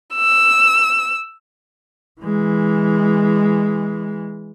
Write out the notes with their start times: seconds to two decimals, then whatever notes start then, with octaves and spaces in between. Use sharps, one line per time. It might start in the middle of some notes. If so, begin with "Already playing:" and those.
0.16 E6
2.21 E3 G#3